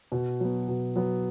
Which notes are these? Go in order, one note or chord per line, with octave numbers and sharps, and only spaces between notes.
B2
F#3 B3
B2
F#3 B3